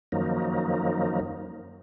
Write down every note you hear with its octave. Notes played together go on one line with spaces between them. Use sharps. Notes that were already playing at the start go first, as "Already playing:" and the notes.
F#2 D#3 F3 F#3 A#3 D#4